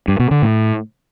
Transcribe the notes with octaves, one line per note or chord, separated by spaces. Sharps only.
G2
B2
D3
A2